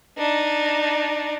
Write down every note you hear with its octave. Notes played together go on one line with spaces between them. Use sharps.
D4 D#4